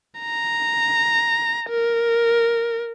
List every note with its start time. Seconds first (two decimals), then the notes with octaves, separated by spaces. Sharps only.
0.21 A#5
1.69 A#4